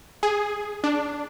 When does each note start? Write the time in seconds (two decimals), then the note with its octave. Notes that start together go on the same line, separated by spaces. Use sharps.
0.23 G#4
0.84 D4